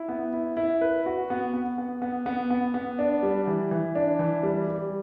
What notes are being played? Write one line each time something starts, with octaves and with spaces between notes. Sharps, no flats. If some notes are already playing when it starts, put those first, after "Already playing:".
Already playing: E4
B3
E4
E4
B4
F#4
B3
B3
B3
B3
B3
B3
B3
D4
G3
E3
E3
D4
E3
G3
G3